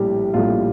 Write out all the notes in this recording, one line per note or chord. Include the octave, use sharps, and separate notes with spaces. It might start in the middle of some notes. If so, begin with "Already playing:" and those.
Already playing: A#1 A2 G3 G4
A#1 A2 G3 F4